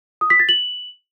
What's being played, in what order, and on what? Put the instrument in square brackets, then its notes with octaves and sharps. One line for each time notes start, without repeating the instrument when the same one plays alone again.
[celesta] D#6
B6
A6
F#7